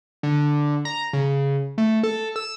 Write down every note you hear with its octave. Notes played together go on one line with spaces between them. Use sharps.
D3
A#5
C#3
A3
A4
E6